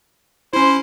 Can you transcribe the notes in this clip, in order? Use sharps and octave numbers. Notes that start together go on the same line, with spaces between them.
C#4 E4 C5